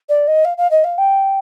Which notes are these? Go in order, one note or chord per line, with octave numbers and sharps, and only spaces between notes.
D5
D#5
F5
F5
D#5
F5
G5